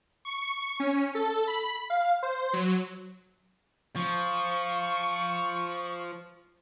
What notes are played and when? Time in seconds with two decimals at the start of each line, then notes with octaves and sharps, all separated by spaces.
0.25 C#6
0.80 C#4
1.15 A4
1.47 B5
1.90 F5
2.23 C5
2.53 F#3
3.96 F3 C#6